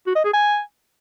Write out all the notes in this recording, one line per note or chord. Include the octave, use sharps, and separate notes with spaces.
F#4
D#5
G#4
G#5